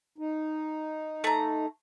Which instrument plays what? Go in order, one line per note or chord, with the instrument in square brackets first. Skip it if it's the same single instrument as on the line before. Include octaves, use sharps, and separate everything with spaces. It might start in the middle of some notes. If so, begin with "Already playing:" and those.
[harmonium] D#4
[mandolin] A3 A#5